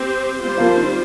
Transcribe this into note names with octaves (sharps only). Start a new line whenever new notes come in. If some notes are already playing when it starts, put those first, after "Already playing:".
Already playing: C4 G4 C5
G3 C4 F4 C5
F3 A#3
D#3